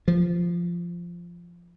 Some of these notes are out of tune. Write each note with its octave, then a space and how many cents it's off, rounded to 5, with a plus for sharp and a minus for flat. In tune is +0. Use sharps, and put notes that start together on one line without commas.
F3 -10